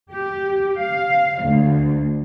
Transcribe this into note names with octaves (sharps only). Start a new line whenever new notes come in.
G4
F5
D2